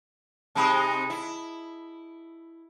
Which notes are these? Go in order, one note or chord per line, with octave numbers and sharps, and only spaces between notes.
C3 G#3 D#4 A5 B5 D#6
E4